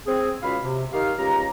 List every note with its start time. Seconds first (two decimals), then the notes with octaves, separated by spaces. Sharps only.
0.07 C4 G#4
0.43 C#2 F#4 F5 B5
0.63 C3
0.92 D#3 G4 F5
1.17 C#2 G4 A#5